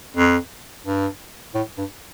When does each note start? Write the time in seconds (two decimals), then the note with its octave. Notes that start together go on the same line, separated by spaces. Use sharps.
0.16 F2
0.86 G2
1.54 A2
1.78 G2